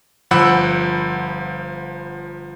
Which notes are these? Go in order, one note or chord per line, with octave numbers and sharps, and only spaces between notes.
G1 F3 F#5 B5 E6